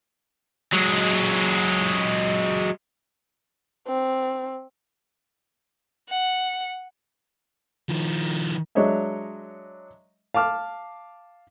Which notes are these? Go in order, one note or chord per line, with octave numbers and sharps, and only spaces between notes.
F#3 G#3
C4
F#5
D#3 F3
F#3 G#3 D4 C#5 D#5 E5
F5 A5 D6 F6